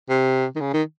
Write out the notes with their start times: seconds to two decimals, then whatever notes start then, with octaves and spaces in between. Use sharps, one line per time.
0.09 C3
0.56 D#3
0.60 C#3
0.74 D#3